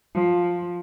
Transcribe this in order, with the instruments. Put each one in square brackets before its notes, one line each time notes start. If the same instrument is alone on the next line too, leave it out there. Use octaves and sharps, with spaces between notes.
[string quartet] F3